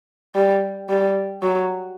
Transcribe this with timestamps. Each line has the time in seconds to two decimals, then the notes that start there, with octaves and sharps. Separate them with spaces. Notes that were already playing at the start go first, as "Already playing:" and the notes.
0.35 G3
0.89 G3
1.42 F#3